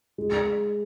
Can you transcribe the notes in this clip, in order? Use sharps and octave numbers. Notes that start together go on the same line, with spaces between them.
G#3